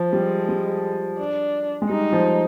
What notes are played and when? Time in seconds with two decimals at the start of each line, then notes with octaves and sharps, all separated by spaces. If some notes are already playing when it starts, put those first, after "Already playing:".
Already playing: F3
0.13 G3 G#3
0.49 G3
1.19 D4
1.82 G#3
1.90 G3 D#4
2.13 F3